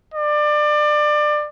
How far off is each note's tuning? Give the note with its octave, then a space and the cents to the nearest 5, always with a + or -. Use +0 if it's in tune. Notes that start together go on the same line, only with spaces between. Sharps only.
D5 +25